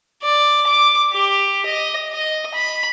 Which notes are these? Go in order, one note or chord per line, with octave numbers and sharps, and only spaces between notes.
D5
D6
G4
D#5
D#5
B5